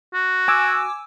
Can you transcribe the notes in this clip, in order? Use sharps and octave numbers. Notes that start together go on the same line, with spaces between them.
F#4
G#5 D6 E6